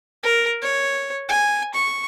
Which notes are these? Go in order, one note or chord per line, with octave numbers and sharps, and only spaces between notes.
A#4
C#5
G#5
C#6